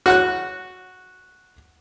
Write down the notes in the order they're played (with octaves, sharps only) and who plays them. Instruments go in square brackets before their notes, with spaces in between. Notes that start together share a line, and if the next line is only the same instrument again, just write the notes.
[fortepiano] F#4 F#5 F#6